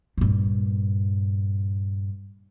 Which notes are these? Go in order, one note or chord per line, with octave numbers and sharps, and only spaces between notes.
G2 A#2